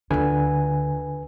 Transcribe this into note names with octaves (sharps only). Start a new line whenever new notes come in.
D2 D3 F4 B4 G#5